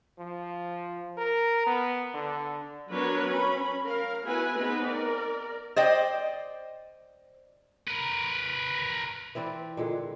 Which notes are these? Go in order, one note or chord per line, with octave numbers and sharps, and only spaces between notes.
F3
A#4
B3
D3
F#3 B3 D4 A#4 B4 C#5
C#4 B5
A#4 F5
B3 E4 F#4 B4 G#5
B3 C4 D#4 G#4 B4
A#4 D5
C5 D5 D#5 G5
A#4 B4
E3 C4 B4 D5
A#2 D3 G#3